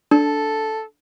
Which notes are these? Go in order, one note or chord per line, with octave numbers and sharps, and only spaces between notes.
D4 A4